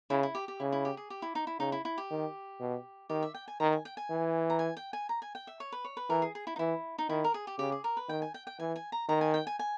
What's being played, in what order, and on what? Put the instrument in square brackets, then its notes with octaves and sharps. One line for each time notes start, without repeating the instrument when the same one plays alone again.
[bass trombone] C#3 [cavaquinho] E4
[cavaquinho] E4
G4
G4
[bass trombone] C#3 [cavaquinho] E4
[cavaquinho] E4
G4
G#4
G4
E4
D#4
E4
[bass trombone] C#3 [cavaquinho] D#4
[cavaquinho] E4
E4
G4
[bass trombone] D#3
B2
[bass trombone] D#3 [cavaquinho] G4
[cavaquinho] E5
G5
G#5
[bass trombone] D#3 [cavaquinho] A#5
[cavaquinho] G#5
G5
G#5
[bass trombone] E3
[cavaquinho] A#5
G#5
G5
G#5
A#5
G#5
G5
E5
C#5
B4
C#5
B4
[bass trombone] E3 [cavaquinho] A#4
[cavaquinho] G#4
G#4
E4
D#4
[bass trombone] E3 [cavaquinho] E4
[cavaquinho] D#4
[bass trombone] D#3 [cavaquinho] E4
[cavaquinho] A#4
G#4
G4
[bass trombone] C#3 [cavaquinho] G4
[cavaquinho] G#4
A#4
B4
[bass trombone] D#3 [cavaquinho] G5
[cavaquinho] G#5
G5
G5
[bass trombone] E3 [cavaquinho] G#5
[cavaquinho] G#5
A#5
[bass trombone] D#3 [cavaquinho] A#5
[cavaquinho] G#5
G5
G#5
G#5